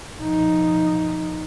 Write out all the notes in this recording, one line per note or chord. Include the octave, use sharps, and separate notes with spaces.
F3 D#4